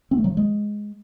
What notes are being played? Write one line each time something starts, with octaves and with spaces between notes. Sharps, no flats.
C4
A3
F#3
F3
G#3